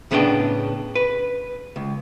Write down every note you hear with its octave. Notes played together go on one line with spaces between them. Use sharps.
A2 C#3 A3 B3 D4 G5
B4
C#2